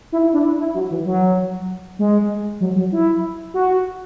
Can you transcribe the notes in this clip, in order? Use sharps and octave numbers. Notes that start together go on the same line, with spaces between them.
E4
E4
D4
E4
E4
F#3
E3
F#3
G#3
F#3
F#3
E4
F#4